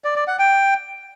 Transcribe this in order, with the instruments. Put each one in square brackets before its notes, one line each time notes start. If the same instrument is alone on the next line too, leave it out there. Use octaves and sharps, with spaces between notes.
[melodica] D5
D5
F#5
G5